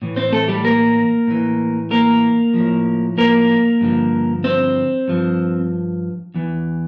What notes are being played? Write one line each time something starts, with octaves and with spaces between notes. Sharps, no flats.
A2 E3
C4 C5
A3 A4
G3 G4
A#3 A#4
A2 E3
A#3 A#4
A2 F3
A#3 A#4
G2 D3 F3
C4 C5
G2 F3
E2 E3